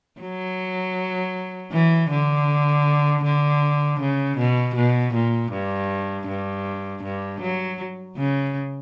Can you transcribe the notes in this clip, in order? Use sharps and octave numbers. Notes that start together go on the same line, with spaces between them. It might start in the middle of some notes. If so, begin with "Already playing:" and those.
F#3
E3
D3
D3
C#3
B2
B2
A#2
G2
G2
G2
F#3
C#3